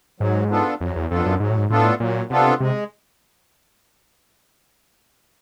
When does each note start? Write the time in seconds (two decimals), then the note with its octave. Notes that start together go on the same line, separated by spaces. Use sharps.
0.20 G#2 F#3
0.50 B3 D4 F4 A4
0.81 F2 F#3
0.96 E2
1.11 F2 B3 D4 F4 A4
1.26 F#2
1.40 G#2 F#3
1.50 A2
1.58 G#2
1.70 A2 B3 D4 F4 A4
2.00 A#2 F#3
2.30 C3 B3 D4 F4 A4
2.60 C3 G#3